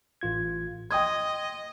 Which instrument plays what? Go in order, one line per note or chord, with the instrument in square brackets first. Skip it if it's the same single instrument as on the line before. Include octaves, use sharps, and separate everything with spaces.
[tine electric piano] A1 F4 G#6
[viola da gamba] D#5 [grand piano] G5 D#6 G#6 [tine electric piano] C6